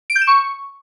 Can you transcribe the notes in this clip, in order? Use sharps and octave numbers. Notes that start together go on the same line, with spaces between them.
D7
G6
E7
C#6